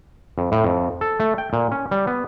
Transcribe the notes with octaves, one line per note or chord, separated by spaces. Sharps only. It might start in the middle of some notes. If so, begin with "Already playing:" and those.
F2
A2
F2
A4
A3
G5
A#2
C#4
G3
B3